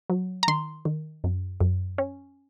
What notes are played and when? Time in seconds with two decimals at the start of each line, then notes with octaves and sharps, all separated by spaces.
0.10 F#3
0.43 A#5
0.48 D#3 C6
0.85 D#3
1.24 F#2
1.61 F#2
1.98 C#4